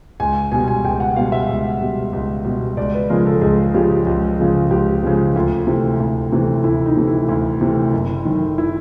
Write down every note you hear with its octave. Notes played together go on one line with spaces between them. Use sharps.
C#2 G#5
B2 G3 G#5
G#5
C#2 G5
F#5
B2 G3 F5
E5
C#2
B2 G3
C#2
B2 G3
C#2 D5
B4
C#3 F3 G#3 A#4
A4
C#2 G#4
C#3 F3 G#3 G4
C#2
C#3 F3 G#3
C#2 G4
C#3 F3 G#3
D2 F4
C3 E3 A3
D2
C3 E3 A3
D2 E4
D#4
C3 E3 A3
E4
D2
C3 E3 A3
F#1
F#2 D#3
E4